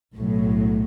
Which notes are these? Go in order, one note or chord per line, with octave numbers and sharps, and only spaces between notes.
B1 A2 F#3